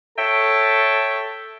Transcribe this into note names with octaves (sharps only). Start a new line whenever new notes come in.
A4 C#5 E5 G5 A5